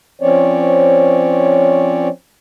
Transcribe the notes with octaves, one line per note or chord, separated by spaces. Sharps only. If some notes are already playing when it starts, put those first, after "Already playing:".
F3 C4 C#4 C#5 D5